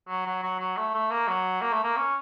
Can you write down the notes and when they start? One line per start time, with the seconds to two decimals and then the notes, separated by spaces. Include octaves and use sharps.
0.08 F#3
0.26 F#3
0.43 F#3
0.59 F#3
0.77 A3
0.94 A3
1.11 A#3
1.28 F#3
1.62 A#3
1.73 A3
1.83 A#3
1.97 C#4